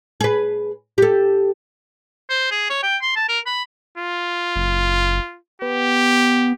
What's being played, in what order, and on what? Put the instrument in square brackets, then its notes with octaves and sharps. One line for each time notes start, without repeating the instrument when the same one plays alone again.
[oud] G#4 B4
G4 A4
[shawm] C5
G#4
C#5
G5
C6
A5
A#4
B5
[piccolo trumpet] F4
[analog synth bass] F#1
[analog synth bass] B3 [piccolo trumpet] G4